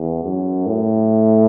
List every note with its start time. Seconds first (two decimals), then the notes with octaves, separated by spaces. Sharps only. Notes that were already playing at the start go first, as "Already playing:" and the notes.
Already playing: E2
0.23 F#2
0.66 A2